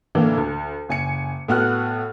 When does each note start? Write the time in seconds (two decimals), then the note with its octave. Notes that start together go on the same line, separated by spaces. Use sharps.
0.15 A2 D3 E3 A#3 D4
0.37 D2
0.89 F#1 G#5 C#7
1.48 A2 B3 F#4 F6 F#6